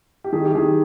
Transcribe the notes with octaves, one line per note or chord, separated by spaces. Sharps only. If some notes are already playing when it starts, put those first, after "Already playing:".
G4
D#3 G#4
G4
D#3 G#4